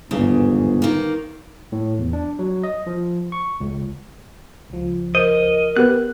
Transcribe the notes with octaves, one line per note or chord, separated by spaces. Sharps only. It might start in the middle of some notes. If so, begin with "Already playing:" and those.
G1 E2 G#2 C#3
D#3 A#3
A2
E2
D4
F#3
D#5
F3
C#6
C#2
C#2 F3
A#4 C5 D#5
B3 G4 B4 F#6